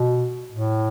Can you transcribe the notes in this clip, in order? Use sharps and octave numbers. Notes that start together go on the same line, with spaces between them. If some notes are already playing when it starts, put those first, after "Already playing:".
Already playing: B2
A2